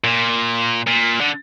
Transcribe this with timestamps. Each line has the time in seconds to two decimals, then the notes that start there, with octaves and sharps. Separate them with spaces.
0.04 A#2
0.87 A#2
1.21 D3